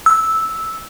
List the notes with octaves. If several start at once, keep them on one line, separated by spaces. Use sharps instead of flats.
E6